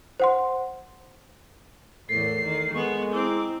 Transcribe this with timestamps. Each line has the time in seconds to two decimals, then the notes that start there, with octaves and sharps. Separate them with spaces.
0.20 C5 F#5 C6
2.09 E2 A2 A4 A#4 C7
2.45 D#3
2.75 G#3 B3 C#6
3.13 C4 E4 A#5 D6